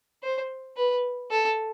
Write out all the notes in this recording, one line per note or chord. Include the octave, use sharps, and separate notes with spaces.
C5
B4
A4